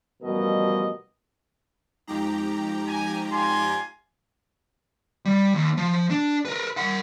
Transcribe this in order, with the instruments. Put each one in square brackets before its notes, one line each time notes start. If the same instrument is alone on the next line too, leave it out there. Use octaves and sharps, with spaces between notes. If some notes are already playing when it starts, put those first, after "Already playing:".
[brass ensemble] A1 B2 F3 G3 A#4 D#5
[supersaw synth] F2 G4 A#5 [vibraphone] G#3 D#4
[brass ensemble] G#5
[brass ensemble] F4 D5 G#5 [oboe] C6
[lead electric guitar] G3
D#2
F3
D4
A#4 B4
A#4 F#5